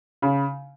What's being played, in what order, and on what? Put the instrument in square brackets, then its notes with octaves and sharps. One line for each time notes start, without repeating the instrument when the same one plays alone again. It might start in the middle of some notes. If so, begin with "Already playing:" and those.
[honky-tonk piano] C#3